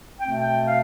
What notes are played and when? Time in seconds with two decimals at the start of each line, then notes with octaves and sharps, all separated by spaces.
0.19 B2 A3 C4 G5
0.38 G5
0.66 F5